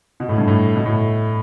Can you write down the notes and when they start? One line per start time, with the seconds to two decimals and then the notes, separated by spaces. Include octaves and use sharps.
0.20 B2
0.29 A2
0.38 G2
0.48 A2
0.76 B2
0.86 A2